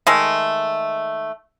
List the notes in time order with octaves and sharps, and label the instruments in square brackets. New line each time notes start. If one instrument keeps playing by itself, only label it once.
[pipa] D#3 G#3 A3